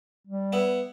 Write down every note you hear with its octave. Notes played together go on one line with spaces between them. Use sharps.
G3
B3 E4